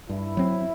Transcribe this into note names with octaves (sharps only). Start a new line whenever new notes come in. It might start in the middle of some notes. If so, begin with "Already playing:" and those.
G2 E4
F#3 C4